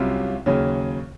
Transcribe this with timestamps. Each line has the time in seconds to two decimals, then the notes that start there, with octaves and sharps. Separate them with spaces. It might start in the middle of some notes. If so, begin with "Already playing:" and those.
Already playing: C2 C3 F#3 C#4 F4
0.46 D#2 C#3 F#3 C#4